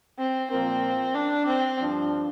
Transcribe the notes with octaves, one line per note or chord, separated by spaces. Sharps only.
C4
A#2 F3 A#3 C4 F4 A#4
D4
C4
G2 F3 D4